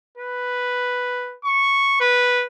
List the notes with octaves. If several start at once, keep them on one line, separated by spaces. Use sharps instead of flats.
B4
C#6
B4